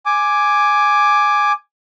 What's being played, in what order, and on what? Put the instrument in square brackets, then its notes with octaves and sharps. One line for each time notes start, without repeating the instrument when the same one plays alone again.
[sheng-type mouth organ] G#5 D6